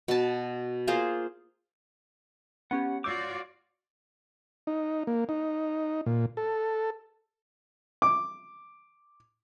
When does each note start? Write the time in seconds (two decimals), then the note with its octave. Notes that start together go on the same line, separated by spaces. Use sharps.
0.08 B2 A5
0.87 A#3 F4 G#4 C5
2.71 B3 C#4 G4 F#5
3.04 F4 F#4 C#5 D5 D6 E6 G6
4.67 D#4
5.07 A#3
5.29 D#4
6.06 A#2
6.37 A4
8.02 D6